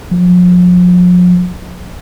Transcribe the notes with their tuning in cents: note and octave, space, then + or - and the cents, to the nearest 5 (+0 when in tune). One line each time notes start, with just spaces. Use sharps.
F3 +40